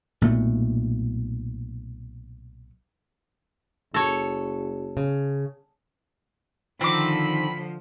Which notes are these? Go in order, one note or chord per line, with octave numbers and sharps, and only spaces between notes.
B1 A#2 A3
F#1 A4 C#5
C#3
D3 D#3 F3 C4 B5 D6